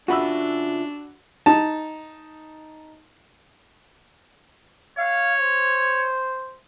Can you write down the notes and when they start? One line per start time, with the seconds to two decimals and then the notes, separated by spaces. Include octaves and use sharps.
0.08 C#3 D4 F4 F#4 E5 B5 E6
1.46 D#4 A5
4.98 C#5 F5
5.40 C5